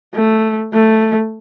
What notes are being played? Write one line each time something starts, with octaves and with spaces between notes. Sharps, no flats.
A3
A3